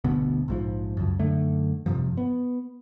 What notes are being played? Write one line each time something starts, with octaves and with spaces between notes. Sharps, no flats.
G1 D2 B2 B3
A#1 G#2 F3
C#2 F#2
F#2 D3 A3
F1 G2 C3 F3
B3